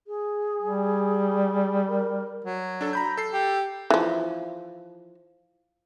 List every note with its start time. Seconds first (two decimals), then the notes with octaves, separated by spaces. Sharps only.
0.07 G#4
0.62 G3
1.87 A#4
2.44 F#3
2.81 D4 A4
2.93 A#5 B5 G6
3.17 A4 C7
3.33 G4
3.90 E3 F3